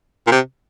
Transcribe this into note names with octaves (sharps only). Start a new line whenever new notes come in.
A#2
C3